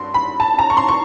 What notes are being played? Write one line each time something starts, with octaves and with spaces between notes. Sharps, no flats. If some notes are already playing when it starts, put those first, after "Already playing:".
Already playing: G2 C6
B5
A5
A#5
C#6
C6
C#6